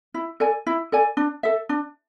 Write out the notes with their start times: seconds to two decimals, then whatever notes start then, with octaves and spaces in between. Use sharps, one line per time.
0.14 E4
0.40 A4 D5 G#5
0.67 E4
0.92 A4 D5 G#5
1.17 D4
1.43 A4 E5
1.69 D4